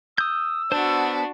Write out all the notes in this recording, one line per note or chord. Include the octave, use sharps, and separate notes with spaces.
D#6 E6 G6
B3 D4 F#4 C5